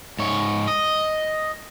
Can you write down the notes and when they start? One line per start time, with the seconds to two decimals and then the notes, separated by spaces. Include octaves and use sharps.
0.19 G#2 C#5
0.68 D#5